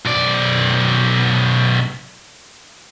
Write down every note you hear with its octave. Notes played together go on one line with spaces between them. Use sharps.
B1 D5